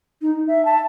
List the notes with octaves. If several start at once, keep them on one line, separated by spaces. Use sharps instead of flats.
D#4
E5
A5